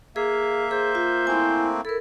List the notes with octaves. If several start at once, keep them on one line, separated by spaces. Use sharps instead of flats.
A#3 G#4 E5 F5
G#4 C5
F4
A3 A#3 C4 E4 G#5
E4 A4 A#4